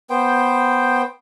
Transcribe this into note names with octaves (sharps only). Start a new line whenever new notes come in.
B3 C5 G5